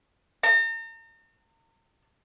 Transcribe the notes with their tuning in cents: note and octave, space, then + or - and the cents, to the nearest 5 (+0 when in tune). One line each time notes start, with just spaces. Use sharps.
A#5 -40